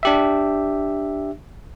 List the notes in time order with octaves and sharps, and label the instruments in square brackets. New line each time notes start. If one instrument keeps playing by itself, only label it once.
[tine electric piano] D4 G4 E5